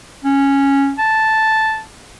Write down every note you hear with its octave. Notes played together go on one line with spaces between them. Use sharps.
C#4
A5